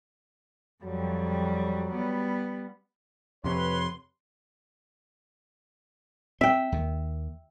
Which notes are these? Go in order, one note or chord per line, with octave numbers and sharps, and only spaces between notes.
F2 F#3 G3
G3 B3
F2 C3 B4 C#5 C6
C4 E5 G5
D#2 D#3